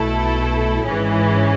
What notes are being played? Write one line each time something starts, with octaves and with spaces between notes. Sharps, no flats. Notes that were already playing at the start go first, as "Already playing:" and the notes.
Already playing: B1 B2 A3 E4 A4
G#1 G#2 E3 G#3 C#4